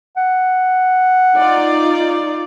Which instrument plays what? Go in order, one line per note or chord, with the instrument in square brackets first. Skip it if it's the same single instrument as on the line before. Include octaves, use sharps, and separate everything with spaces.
[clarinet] F#5
[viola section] D#4 F4 D5